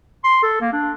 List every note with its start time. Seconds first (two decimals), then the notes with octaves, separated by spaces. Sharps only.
0.24 C6
0.43 A4
0.61 A#3
0.73 D4